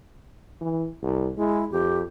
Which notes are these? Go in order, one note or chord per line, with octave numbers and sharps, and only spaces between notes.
E3
C2
G#3 E4
F2 G4